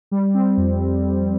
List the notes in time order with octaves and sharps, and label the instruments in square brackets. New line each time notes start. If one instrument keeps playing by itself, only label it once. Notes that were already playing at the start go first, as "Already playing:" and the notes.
[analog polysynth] G3
C4
F2